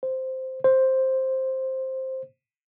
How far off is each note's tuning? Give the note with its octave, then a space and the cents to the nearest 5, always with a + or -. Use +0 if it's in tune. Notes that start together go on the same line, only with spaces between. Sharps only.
C5 -5
C5 +5